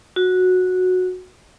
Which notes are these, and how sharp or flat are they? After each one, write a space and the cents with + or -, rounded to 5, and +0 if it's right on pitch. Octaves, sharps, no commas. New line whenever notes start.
F#4 -10